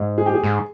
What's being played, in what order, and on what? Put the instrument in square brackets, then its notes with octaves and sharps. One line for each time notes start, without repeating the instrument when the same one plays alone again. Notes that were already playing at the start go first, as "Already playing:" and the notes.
Already playing: [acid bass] G#2
[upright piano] G#4
G4
G#4
[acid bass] G#2